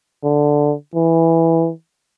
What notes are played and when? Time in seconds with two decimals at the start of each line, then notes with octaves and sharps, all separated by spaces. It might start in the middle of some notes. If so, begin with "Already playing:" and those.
0.24 D3
0.95 E3